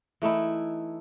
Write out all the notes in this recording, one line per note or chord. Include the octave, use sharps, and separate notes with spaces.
E3 A3 D#4 E4